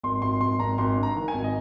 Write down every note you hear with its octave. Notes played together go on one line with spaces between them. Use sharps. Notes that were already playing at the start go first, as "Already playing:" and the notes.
G#1 C6
G#1 C6
G#1 C6
G#1 A#5
G#1 C6
G2
A#5
D#3
G#5
G#1
D#5